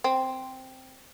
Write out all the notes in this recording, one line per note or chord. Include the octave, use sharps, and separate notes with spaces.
C4